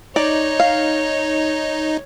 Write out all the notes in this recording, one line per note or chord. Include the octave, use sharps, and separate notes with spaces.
D#4 C#5 D5
F5